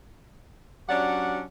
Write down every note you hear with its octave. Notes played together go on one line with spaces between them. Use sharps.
F#3 C#4 D4 G4 D5 F#5